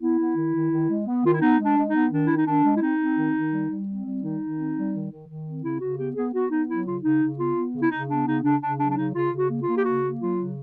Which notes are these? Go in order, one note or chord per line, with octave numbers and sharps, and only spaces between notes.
B3 E4
B3
D#3
D#3
D#3
G#3
B3
D#3 F4
E4
B3 D#4
G#3
D4
G#3
D#4
B3
D#3 D4
D#3 E4
D#4
D#3 D4
G#3
E4
C4 D#4
C4
D#3
D#3
G3
G3
C4
G3
D#3 D#4
D#3
C4
G3
D#3
D#3
D#3
C4
C#3 E4
C#3 F#4
B3 G4
B3 G#4
B3 F#4
B3 D#4
F#3 E4
C#3 F4
C#3 D#4
C#3
B3 F4
B3
C#3
E4
C#3 D#4
B3 D4
C#3 D#4
C#3 D4
C#3 D4
F#3 D4
D4
C#3 D#4
C#3 F4
C#3
F#4
A#3
F4
A#3
G4
C#3 F#4
A#3
F#3 F4
C#3